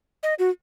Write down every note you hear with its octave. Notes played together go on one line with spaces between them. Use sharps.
D#5
F#4